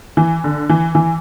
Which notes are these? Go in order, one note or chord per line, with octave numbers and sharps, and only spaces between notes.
E3
D3
E3
E3